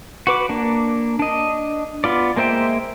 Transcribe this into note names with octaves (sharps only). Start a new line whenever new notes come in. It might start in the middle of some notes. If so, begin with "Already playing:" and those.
F#4 B4 D6
A#3 D4
D4 D#5
B3 F4 D5
G#3 A#3 C5 E5 G5